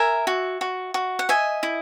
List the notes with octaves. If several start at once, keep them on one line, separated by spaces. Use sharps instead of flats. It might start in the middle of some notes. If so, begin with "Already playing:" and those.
Already playing: A#4 E5 G#5
F#4
F#4
F#4
F#5
D#5 E5 G#5
E4